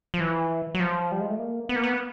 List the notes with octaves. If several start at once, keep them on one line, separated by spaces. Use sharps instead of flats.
F3
E3
F#3
F3
G3
G#3
A3
A#3
B3
A#3
B3